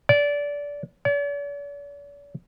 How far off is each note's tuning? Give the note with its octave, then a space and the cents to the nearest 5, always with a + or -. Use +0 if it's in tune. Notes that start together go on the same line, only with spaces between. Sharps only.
D5 -20
D5 -45